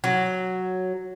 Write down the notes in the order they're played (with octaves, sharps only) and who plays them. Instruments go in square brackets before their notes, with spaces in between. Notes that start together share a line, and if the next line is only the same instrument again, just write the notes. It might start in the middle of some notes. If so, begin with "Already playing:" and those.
[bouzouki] F#3